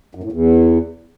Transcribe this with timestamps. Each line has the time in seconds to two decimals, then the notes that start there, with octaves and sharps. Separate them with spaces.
0.15 F#2
0.23 A2
0.32 E2